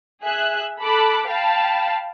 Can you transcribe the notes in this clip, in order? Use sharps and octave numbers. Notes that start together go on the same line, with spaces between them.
G#4 E5 F#6
A4 B5 D6 F#6
F5 G5 A5 B5